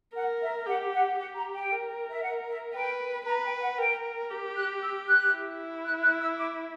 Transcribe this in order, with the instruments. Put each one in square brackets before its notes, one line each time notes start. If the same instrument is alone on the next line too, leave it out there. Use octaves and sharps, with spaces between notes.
[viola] A#4 [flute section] F#5
[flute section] E5
[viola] G4 [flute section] F#5
[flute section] F#5
[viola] G4 [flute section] F#5
[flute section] A#5
G5
[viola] A#4
[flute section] E5
F#5
E5
[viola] B4 [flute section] G5
[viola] B4 [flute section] A#5
[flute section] G5
F#5
[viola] A#4 [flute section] G5
[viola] G4
[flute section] F#6
E6
F#6
[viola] E4
[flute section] F#6
F#6
E6
D6